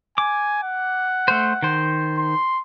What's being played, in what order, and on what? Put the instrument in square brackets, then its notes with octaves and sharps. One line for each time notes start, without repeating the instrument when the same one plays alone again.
[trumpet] G#5 [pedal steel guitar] D6
[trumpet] F#5
[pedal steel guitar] A3 C5
D#3 C5
[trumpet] C6